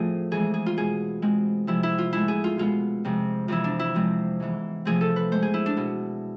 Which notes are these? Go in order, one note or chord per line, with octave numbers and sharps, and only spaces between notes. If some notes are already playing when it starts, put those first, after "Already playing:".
Already playing: A2 F3 A3 C4 F4 G#4
F2 E3 G#3 B3 G#4
G#4
F4
B2 G#3 B3 G#4
B2 G#3 C4
C3 F3 G#3 E4
E4
F4
A2 G#3 B3 E4
G#4
F4
B2 G#3 B3 F4
F2 C3 G#3
F2 C3 E3 B3 E4
D4
E4
C3 F3 G#3 C4
G#2 E3 B3
C3 F3 A3 C4 G#4
A4
B4
A2 G#3 B3 C5
G#4
E4
D4
B2 B3